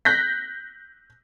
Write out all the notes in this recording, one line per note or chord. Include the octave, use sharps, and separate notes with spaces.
F#6 G6 A#6 B6